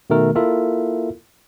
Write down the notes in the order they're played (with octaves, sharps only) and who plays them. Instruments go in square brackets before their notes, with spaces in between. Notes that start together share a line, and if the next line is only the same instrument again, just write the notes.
[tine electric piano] B2 D#3 A3 A#4
A#3 E4 F4 A4 A#4 E5